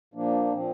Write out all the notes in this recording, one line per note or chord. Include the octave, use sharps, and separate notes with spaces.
A#2 F3 A#3 D4
A#2 F3 C4